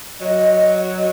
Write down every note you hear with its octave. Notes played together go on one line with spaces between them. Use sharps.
F#3 D#5